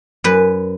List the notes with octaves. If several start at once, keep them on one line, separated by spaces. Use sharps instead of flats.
F#2 B4